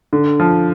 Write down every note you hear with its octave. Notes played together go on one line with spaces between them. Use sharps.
D3
F3